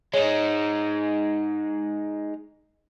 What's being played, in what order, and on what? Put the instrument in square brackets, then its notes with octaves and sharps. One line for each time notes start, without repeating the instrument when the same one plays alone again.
[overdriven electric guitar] G#3 D#4 [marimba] C#5